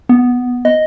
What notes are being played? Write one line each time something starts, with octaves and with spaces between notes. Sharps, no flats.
B3
D#5